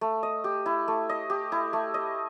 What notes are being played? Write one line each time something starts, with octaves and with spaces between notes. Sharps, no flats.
A3
D#5
G4
E4
A3
D#5
G4
E4
A3
D#5